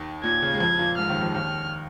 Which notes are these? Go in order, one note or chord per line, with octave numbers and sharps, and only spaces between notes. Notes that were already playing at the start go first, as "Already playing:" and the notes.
Already playing: D#2 D#3
A#2 G#6
C#3
G#3
F2 F3 G#6
A#2 A#3
G#2 G#3 F6
D#2 D#3
F2 F3
D#2 D#3 F6